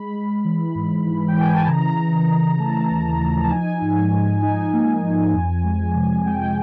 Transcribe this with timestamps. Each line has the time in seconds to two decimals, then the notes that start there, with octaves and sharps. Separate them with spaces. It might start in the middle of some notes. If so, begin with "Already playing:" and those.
Already playing: G#3 B5
0.14 G#3
0.45 E3
0.75 G#2
1.06 E3
1.28 G5
1.36 E3 G#5
1.54 A5
1.68 C#3 A#5
1.99 C#3
2.29 C#3
2.59 A3 A5
2.90 D#2
3.20 F3
3.44 A5
3.50 D#4 G#5
3.82 G#2
4.13 G#2
4.42 D#4 G#5
4.73 A#3
5.03 F3
5.34 F2
5.64 G#3
5.95 C3
6.26 G#3 G5